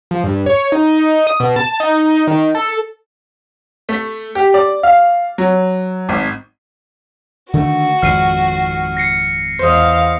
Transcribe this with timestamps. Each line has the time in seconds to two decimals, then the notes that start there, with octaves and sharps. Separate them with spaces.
0.11 F3
0.24 G2
0.46 C#5
0.72 D#4
1.27 D#6
1.40 B2
1.56 A5
1.80 D#4
2.27 D#3
2.55 A4
3.89 A3
4.35 G4
4.54 D5
4.83 F5
5.38 F#3
6.09 G#1
7.54 D3 D#3 A3 F#4
8.02 G#1 F2 F6 C7 D#7
8.97 A#6 C7 C#7
9.59 E2 C5 D#5 F5